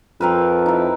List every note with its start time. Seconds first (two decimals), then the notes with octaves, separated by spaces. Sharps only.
0.21 F2 C4 A#4 B4
0.66 D#4 E4